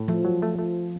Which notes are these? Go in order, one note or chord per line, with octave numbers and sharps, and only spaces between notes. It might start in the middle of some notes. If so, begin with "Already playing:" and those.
Already playing: A2
F3 A3
F#3
A3
A3